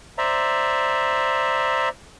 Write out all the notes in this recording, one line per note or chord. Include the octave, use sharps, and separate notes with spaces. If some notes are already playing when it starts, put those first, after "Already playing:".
C5 D5 E5 A#5